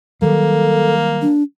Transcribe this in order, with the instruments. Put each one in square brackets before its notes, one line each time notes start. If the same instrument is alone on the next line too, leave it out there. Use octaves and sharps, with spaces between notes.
[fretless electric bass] D#3 F#3 G3 [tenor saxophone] A#3 [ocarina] A4
[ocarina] D4